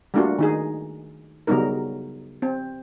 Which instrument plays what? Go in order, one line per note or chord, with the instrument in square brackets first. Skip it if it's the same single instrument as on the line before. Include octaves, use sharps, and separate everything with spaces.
[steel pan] G3 A3 A#3 D4 F4 F#4
D#3 D#4 G#4
C#3 F#3 G3 B3 D#4 A#4
C4